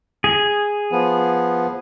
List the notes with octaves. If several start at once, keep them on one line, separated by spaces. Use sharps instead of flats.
G#4
F3 B3